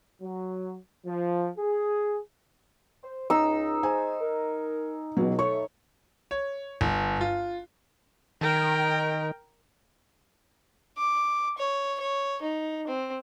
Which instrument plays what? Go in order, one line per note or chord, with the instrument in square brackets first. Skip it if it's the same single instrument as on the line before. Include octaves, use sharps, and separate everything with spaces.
[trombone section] F#3
F3
G#4
[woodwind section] C5
[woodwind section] C#2 [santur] D#4 E6
[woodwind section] G#4 C5 [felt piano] G#5
[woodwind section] A#4
[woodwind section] C#2 [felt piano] B2 F#3
[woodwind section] A3 [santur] C#5 [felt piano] C#6
[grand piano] C#5
G1
F4
[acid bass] D#3 [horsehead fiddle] A#4 G5
[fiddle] D6
C#5
C#5
D#4
C4